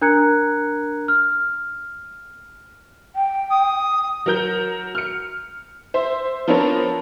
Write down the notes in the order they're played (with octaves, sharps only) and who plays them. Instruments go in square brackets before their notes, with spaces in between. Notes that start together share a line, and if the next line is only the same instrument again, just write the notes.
[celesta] D4 A#4 A#5 F#6 G#6 C#7
F6
[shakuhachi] G5
[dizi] D#6
[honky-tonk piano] F#3 A#4 G6
F6 C#7
C5 E5
F3 B3 C4 D4 A#4 C#5